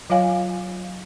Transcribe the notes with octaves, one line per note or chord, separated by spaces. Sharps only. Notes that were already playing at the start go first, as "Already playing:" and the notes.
F#3 F4 C#5 F5 G#5